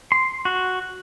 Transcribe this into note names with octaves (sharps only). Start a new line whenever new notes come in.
C6
F#4